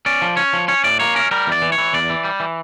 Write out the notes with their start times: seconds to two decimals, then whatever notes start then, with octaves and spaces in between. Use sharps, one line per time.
0.06 C#4 D5
0.22 F3
0.37 C#4 C#5
0.53 F3
0.68 C#4 C#5
0.84 A2 D5
0.99 A#3 C#5
1.15 C#4 A#4
1.31 G3 A#4
1.47 E2 D5
1.62 E3
1.72 C#5
1.78 E3
1.94 E2 D5
2.10 E3
2.24 G3
2.40 E3